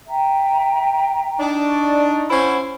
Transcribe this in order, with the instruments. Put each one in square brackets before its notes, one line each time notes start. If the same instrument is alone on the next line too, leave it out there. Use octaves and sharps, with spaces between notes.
[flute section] E5 G5 A#5
[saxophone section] D4 D#4
[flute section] D5 C#6
[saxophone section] C#4 E4 C5 [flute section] F#5